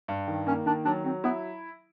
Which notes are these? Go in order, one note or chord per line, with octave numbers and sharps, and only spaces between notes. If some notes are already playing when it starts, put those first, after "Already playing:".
G2
D#3
A#3 C#4
D#3 D4
F#3 D4
F#3 C4
B3 E4